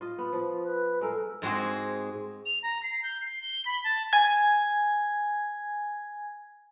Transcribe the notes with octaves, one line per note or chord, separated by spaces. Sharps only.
F4 D#5
B3
F3
B4
G#3 A4 A#4
G#2 G#3 C4 F#4 G#4
F7
A#5
C7
G6
C7
G7
B5
A5
G#5 G#6